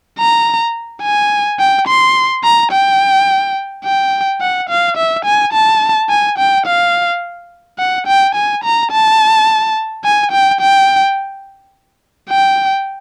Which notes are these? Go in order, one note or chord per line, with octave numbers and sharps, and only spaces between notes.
A#5
G#5
G5
C6
A#5
G5
G5
F#5
F5
E5
G#5
A5
G#5
G5
F5
F#5
G5
G#5
A#5
A5
G#5
G5
G5
G5